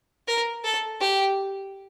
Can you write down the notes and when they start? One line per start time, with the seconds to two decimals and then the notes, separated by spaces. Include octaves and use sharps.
0.28 A#4
0.64 A4
1.01 G4